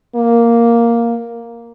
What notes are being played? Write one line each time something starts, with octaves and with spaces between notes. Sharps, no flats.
A#3